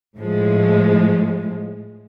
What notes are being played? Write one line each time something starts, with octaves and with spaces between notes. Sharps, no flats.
A2 F3 G#3